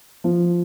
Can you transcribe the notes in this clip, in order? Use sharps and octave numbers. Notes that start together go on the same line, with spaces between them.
F3